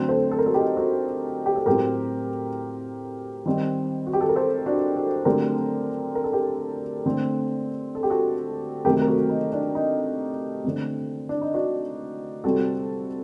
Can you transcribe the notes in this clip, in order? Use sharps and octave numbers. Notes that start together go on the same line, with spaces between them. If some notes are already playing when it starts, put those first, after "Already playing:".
Already playing: D3 F#3 A3 C4
A4 C5
A4
A#4
F#4 A4
D#4 G4
F#4 A4
G4
A4
A2 F#3 C4 G4 A#4
D#3 G3 C4
F#4
G4
A4
A#4
A4 C5
D4 F#4
F#4 A4
D3 F#3 A3 C4 G4 A#4
A#4
A4
G4 A#4
D3 A3 C4
A4
G4
F#4 A4
C3 D#3 F#3 A3 C4 G4 A#4
A#4
F#4 A4
D#4
D4
D#4
D3 A3 C4
D4
D#4
D4 F#4
C3 G3 C4 F#4 A4